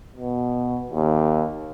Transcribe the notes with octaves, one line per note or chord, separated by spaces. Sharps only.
B2
D#2